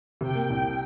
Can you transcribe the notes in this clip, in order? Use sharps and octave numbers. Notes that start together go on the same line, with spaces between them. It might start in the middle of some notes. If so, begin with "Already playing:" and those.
C3 G5
A#3
C2